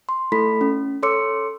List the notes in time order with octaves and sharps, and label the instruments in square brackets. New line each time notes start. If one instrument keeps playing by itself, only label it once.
[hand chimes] C6
A3 E4 A4 B5 B6
C#4
A4 C#5 C6 D6 E6 C#7